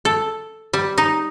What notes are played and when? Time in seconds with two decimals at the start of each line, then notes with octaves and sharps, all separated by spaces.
0.05 A4
0.73 G3
0.98 D#4